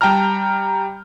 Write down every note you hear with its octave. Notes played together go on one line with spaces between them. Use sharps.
G3 G5 A5 A#5 F6